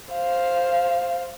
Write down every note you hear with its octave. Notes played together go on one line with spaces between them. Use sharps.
C5 F5